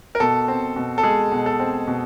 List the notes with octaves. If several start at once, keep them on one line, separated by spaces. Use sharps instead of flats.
A#4
B2 A4
C4
B2
A4
G#3 G#4
B2
A4
C4
B2